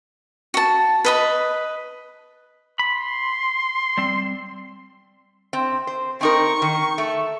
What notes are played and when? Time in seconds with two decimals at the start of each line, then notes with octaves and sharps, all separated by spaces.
0.54 F#4 A5
1.05 B4 D#5 B5
2.79 B5 C6
3.98 G3 C4
5.53 C4
5.87 C5
6.21 C4 D#4 A#4 C#6
6.62 D#3
6.98 A3